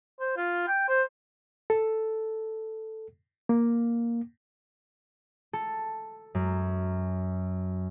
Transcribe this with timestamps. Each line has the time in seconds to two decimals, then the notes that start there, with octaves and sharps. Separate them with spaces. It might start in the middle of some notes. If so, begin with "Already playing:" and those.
0.20 C5
0.37 F4
0.67 G5
0.88 C5
1.70 A4
3.49 A#3
5.53 A4
6.35 F#2